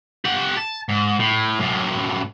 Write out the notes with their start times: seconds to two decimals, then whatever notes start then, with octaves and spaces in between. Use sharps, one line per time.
0.25 G4 F#5
0.57 A5
0.89 G#2
1.19 A2
1.59 F#2 A2